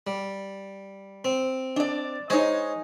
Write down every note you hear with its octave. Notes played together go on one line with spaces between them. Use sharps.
G3
C4
D4 D5
G#3 D#4 C5 C#5